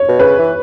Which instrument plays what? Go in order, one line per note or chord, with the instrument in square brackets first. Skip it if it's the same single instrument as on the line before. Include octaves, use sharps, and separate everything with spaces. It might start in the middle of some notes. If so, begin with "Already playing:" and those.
Already playing: [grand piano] C#5
[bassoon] B2
[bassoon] C#3 [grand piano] B4
[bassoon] E3